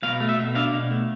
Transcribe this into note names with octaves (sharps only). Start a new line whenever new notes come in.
B2 F5
A3
E5
B2
D4 F5
B2
A3